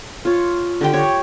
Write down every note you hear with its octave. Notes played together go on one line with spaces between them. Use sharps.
F4 C#5
D3 G4 G5
C#5